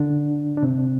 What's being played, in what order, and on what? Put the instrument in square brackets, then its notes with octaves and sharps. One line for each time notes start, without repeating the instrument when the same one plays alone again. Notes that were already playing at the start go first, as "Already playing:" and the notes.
Already playing: [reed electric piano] D3 D4
D4
C3 C4